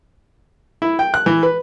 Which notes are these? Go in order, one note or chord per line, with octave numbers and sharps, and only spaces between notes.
E4
G5
F#6
E3
B4